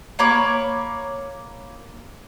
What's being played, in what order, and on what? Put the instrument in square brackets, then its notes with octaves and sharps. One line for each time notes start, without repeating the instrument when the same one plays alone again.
[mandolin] A#3 C#5 B5 D6